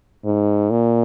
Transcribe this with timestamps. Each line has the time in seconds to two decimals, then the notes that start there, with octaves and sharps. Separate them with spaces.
0.25 G#2
0.70 A#2